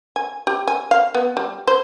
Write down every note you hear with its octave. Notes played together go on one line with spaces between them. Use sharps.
G#5
G4
G#5
F5
B3
G3
C5